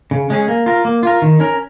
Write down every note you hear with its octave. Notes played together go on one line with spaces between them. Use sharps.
C#3
G#3 C#4 G#4
A#3
F4 A#4
A#3
F4 A#4
D#3
C#4 A#4